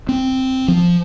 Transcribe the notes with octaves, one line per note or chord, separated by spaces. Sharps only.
C4
F3